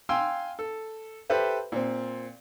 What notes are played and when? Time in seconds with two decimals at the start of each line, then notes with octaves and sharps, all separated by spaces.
0.09 F5 G5 G#5 C6 E6
0.59 A4
1.30 G4 A4 B4 C5 E5
1.72 A#2 C4